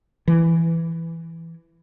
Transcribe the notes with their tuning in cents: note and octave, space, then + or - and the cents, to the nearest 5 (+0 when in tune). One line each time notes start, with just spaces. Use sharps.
E3 +5